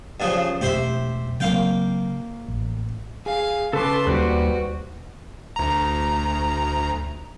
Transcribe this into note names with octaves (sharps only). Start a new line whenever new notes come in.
G2 C#3 F3
E2 B2 A3 G4 C5 E5
C#3 F#3 A#3 C4 F5 G5
A1
G#4 F5
C#3 A4 B4 A5 C6 D6
D#2 G3 F#4 G4 B4 C5 D5
D2 A#5